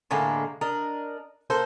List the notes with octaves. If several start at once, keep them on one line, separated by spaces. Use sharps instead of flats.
A2 D3 G#3 A#3
D4 A#4 D#5
A#3 A4 C5